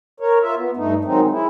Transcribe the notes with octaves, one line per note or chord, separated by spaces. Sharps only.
A#4 C#5
F4 E5
B3
G2 A3 D#4
D#3 F#3 G#3 C4 D#4
G#3 E4